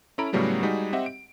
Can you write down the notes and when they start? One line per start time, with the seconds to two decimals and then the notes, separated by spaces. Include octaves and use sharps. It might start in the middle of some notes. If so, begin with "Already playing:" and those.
0.18 C#4 E4 A4 A#5 B5 D7
0.33 A2 C#3 F#3 G3 A3 B3
0.63 G3 G#3 D#4 F#4 G#4
0.93 C4 G4 D#5 E5 F#5
1.06 D7